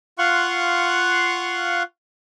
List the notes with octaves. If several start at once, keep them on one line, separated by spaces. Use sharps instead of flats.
F4 F5 F#5 C6 C#6 F#6